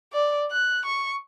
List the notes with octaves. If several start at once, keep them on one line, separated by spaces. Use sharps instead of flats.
D5
F#6
C#6